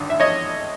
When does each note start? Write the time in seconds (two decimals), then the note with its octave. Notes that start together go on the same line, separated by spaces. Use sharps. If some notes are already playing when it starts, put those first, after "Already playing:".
Already playing: G#1 G2 D3
0.10 E5
0.20 C#5 D#5